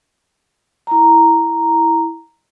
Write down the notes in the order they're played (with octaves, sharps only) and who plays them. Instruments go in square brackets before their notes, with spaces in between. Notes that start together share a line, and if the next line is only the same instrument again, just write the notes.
[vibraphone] E4 A#5